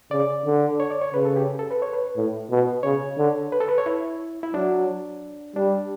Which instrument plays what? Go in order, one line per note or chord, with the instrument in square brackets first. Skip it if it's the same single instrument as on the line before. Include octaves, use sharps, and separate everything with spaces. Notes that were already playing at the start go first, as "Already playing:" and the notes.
[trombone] C#3 [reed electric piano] D5
[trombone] D3
[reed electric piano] C#5
D5
C#5
[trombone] C#3 [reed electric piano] B4
[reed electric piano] A4
G4
A4
B4
C#5
B4
[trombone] A2
B2
[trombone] C#3 [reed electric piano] C#5
[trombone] D3
[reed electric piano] B4
A4
B4
C#5
E4
E4
[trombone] F#3 [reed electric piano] D4
[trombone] G3 [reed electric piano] D4